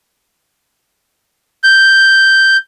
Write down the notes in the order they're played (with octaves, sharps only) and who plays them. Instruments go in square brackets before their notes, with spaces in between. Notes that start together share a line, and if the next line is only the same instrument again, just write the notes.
[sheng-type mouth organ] G6